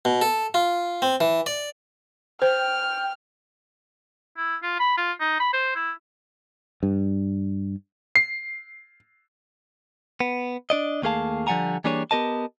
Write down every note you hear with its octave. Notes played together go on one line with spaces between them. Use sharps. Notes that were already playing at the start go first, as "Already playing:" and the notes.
B2
A4
F4
C4
E3
D5
C5 G5 F6
E4
F4
B5
F4
D#4
B5
C5
E4
G2
C7
B3
D4 D5 D#5
D#2 A3 A#3 G#4 F5 A5
D3 F3 G3 F#5 G#5 A#5
E3 G3 A#3 D4 G#4 C#5
B3 G4 A#4 D#5 A5